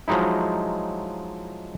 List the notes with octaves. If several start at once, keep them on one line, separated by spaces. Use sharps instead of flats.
F3 F#3 G#3 D#4 E4